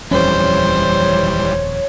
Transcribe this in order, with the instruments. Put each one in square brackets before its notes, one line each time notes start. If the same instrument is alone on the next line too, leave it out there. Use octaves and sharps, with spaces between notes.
[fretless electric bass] D#1 F2 C#4 [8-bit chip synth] E3 G3 [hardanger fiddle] C5 [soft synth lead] C#5